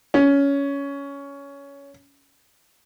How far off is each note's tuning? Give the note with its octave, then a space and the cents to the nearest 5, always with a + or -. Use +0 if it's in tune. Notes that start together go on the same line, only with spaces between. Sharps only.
C#4 +15